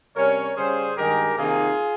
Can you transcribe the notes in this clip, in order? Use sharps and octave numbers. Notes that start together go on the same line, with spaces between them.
C3 G3 C#4 A#4 C#5
C#3 G3 C#4 G#4 C5
G2 D#3 G#3 D#4 G4 A#4
C3 D#3 A#3 D#4 F4 G#4